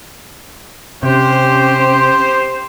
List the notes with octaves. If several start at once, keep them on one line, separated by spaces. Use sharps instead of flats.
C3 C#4 G4 C5